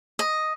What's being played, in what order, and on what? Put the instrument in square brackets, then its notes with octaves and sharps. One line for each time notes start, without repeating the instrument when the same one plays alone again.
[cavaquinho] D#5